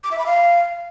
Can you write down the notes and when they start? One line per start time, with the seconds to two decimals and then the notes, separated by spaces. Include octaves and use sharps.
0.04 D6
0.11 E5
0.19 B5
0.26 F5